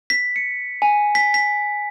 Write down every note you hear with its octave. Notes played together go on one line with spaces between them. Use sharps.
B6
C#7
G#5
B6
B6